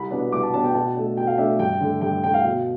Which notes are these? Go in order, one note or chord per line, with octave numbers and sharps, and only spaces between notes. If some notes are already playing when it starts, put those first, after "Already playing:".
Already playing: C2 B5
B2 B3 D4
C2 D6
A5
B2 B3 D4 A5
G5
B2 A5
A3 D4
B2 G5
F5
A3 D4 E5
G2 G5
D3 A3
G2 G5
D3 A3 G5
F5
B2